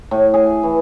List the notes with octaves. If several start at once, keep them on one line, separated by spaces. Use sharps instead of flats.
A2
G#4
E3